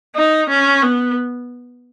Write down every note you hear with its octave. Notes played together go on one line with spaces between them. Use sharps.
D#4
C#4
B3